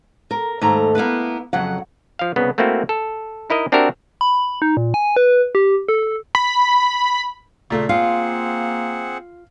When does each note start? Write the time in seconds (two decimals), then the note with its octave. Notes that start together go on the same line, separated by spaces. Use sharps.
0.31 A#4
0.61 D#2 G#2 A3 A#5
0.95 A#3 B3 E4 B4
1.53 F2 C#3 F#3 F#5
2.19 F3 F5
2.36 C2 C#3 B3
2.58 A3 A#3 C4 E4 F#4
2.89 A4
3.50 D#4 E4 A#4 D#5
3.72 C4 D4 F#4 G4 A#4 E5
4.21 B5
4.62 D#4
4.77 A#2
4.94 G#5
5.16 B4
5.55 G4
5.88 A4
6.35 B5
7.70 A#2 C#3 A3
7.89 A#3 C4 F4 G#4 F5 F#5